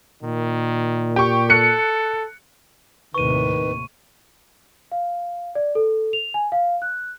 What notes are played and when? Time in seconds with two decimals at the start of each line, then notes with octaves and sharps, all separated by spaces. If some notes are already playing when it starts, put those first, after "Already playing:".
0.23 A#2 D#3
1.16 G4 C#6
1.50 A4 F#6 C#7
3.14 D#2 A2 C3 D#3 B4 C#6 D#7
4.92 F5
5.55 D5
5.75 A4
6.13 F7
6.34 G#5
6.52 F5
6.82 F#6